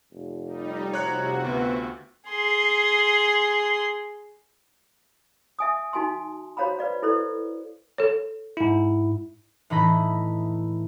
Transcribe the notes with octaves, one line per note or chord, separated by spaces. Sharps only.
F1
G3 D#4
C3 F#4 C5 C#5 A#5 F#6 C#7
D2 B3 F4 E5
G#4 C6
E5 G#5 D#6
D#4 F#4 G#5 A5 C6
F#4 C5 C#5 F5 A#5 B5
B4 D5 F5
E4 A4 B4 C5 D5
A4 C#5
G#2 E4
A2 E3 D#4 D#5 B5